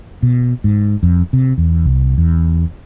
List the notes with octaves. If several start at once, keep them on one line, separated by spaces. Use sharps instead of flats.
B2
G#2
F2
C3
E2
C2
E2